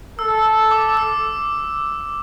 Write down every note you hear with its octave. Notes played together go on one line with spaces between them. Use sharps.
A4 E6
D6
E6